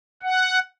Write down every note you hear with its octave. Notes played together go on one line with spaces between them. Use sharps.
F#5